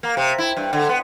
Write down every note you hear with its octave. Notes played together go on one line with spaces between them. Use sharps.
A#3
C3
E4
G2
D3
B3